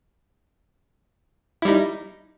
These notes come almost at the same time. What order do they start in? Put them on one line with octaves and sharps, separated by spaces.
E4 G3 D#4